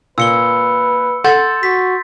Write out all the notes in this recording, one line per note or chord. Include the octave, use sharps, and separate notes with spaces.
A#2 B4 E6 C#7 G7
A4 F#5 C6 G6 A6
F#4 B6